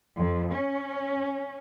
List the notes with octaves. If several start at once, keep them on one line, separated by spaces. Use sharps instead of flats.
F2
C#4